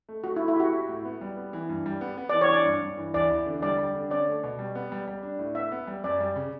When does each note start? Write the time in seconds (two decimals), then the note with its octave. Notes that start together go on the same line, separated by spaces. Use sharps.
0.09 A3
0.24 A3 F#4
0.36 E4
0.40 A3
0.48 E4
0.56 F#4 G4
0.73 E4
0.89 A2
1.05 B3
1.21 G3
1.37 B3
1.53 E3
1.69 G2
1.86 G3
2.01 B3
2.17 B3
2.29 D5
2.33 E3
2.41 C#5
2.49 D4 D5
2.65 G2
2.82 G2
2.97 E3
3.14 E2 D5
3.31 E2
3.46 D3
3.62 G3 D5
3.78 G3
3.95 D3
4.10 C#4 D5
4.27 A3
4.43 B2
4.59 G3
4.75 B3
4.92 G3
5.08 G3
5.23 D4
5.39 A2
5.55 B3 E5
5.72 B3
5.87 G3
6.04 F#2 D5
6.20 G3
6.36 C#3